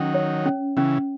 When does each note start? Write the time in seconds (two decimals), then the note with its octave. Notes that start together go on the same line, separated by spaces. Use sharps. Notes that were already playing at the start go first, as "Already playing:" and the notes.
Already playing: D#3 F#3 C#4
0.14 C#5
0.46 C#4
0.77 C#3 E3 C#4